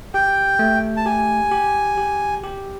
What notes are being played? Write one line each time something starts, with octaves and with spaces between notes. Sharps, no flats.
G4 G5
A3
A5
G4 G#5
G4
G4
G4